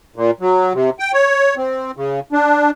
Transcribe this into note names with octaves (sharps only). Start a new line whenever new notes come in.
A#2
F#3
C3
G5
C#5
C4
C#3
D4